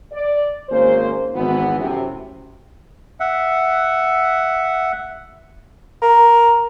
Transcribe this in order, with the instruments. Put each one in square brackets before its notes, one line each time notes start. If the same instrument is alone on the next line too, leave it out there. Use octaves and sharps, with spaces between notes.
[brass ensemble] D5
G#1 A#3 C#4 G#4 C5
G#1 E3 B3
F#2 A2 C3
[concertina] E5 F#5
[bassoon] A#4